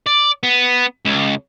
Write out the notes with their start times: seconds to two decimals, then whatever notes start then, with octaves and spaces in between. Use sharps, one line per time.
0.07 D5
0.43 B3
1.06 C#2